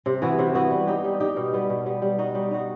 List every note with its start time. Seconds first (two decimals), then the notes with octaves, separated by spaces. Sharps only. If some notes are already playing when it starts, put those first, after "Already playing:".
0.06 C3
0.22 E3 B3 F#4
0.39 C3
0.54 E3 B3 F#4
0.71 G3
0.87 D#4 G4
1.04 G3
1.20 D#4 G4
1.36 B2
1.53 G3 B3
1.70 B2
1.86 G3 B3
2.02 G3
2.19 D#4 F#4
2.35 G3
2.51 D#4 F#4